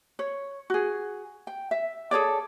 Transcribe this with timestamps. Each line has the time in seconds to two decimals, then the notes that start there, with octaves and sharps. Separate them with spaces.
0.19 C#5
0.70 F#4 G#4
1.47 G5
1.71 E5
2.11 G#4 A4 C#5 D5